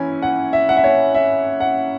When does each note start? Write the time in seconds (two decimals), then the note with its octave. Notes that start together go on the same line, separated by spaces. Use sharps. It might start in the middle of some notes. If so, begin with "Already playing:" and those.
Already playing: E3 C#4 E4 G#5
0.22 F#5
0.53 E5
0.69 F#5
0.77 E5
0.84 C#5
1.15 E5
1.60 F#5